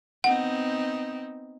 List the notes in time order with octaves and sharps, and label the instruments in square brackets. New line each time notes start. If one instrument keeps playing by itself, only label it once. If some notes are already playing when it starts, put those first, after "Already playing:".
[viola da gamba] B3 C4 D#4 [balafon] F#5